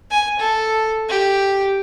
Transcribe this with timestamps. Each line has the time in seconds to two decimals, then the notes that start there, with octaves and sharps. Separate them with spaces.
0.11 G#5
0.39 A4
1.09 G4